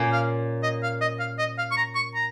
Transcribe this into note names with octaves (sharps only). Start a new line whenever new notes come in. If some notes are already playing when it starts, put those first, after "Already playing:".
Already playing: A#2 A#3 C#4
F5
D#5
F5
D#5
F5
D#5
F5
C#6
A#5
C#6
A#5